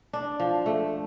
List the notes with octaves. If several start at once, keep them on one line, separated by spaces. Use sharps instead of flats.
D4
F3
A3